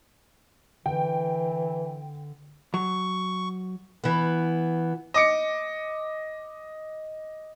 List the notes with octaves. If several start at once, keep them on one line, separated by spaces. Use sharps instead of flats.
D3 E3 G5
F#3 C#6
E3 B3
D#5 D6 C#7